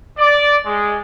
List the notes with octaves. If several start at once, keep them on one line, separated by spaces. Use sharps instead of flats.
D5
G#3